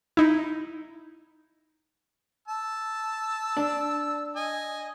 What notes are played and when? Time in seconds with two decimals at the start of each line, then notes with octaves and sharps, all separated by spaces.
0.17 D#4 E4
2.48 A5 E6
3.57 D4
4.36 D#5 G#5